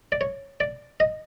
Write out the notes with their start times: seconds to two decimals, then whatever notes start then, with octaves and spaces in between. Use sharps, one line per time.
0.12 D5
0.21 C#5
0.60 D5
1.00 D#5